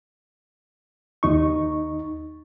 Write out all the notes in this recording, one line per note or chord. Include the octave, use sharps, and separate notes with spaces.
D#2 D#4 C#6